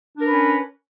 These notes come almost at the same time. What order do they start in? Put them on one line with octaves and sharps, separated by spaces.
D4 A#4 B4 C#4